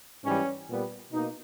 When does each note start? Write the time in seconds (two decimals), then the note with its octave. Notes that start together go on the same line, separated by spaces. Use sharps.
0.24 G#2 E3 G3 C#4
0.68 A#2 G3 B3
1.12 B2 A#3 D#4